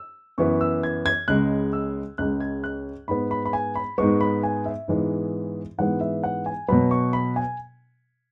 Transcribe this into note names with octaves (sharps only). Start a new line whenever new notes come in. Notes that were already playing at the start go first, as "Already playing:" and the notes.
Already playing: E6
F#2 E3 B3 C#6
E6
G#6
G#6
C#2 C#3 G#3 F#6
E6
C#2 C#3 G#3 F#6
G#6
F#6
G#2 G#3 B3 B5
B5
B5
G#5
B5
G#2 G#3 B3 C#6
B5
G#5
E5
G#2 E3 G#3 B3
G#2 E3 G#3 B3 F#5
E5
F#5
G#5
B2 F#3 B3 B5
C#6
B5
G#5